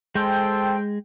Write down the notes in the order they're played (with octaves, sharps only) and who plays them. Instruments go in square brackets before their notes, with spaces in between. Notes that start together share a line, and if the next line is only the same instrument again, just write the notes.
[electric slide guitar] G#3 [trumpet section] A4 C5 [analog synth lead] G5